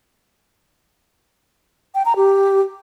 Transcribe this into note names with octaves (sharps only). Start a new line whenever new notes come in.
G5
A#5
G4